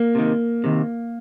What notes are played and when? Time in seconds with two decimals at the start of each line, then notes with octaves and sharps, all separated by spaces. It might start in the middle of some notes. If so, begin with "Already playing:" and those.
Already playing: A#3
0.15 C3 D#3
0.64 C3 D#3